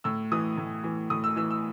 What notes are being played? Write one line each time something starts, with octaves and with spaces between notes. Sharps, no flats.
A2 E6
E3 D#6
A2
E3
A2 D#6
E6
E3 E6
E6